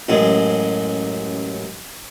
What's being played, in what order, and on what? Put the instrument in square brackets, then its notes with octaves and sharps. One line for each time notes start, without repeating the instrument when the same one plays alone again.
[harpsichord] A1 F#2 G#3